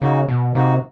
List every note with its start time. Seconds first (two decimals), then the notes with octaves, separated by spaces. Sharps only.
0.01 C#3 A#3 D#4 F#4
0.28 B2
0.55 C3 A#3 D#4 F#4